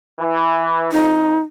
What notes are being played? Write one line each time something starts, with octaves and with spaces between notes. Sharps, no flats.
E3
F2 D#4